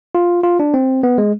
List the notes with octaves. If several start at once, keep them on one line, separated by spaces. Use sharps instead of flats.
F4
F4
D4
C4
B3
G#3